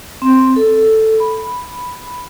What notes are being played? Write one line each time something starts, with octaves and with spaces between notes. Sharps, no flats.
C4
A4
B5